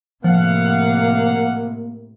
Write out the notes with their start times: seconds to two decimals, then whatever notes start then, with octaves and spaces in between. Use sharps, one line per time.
0.24 A2 C3 F3 A#3 F5 F#5